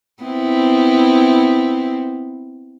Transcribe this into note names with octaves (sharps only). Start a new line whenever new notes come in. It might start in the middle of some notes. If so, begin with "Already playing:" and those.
B3 C4 E4